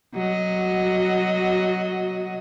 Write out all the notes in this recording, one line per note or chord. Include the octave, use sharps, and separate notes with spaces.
F#3 F#4 D#5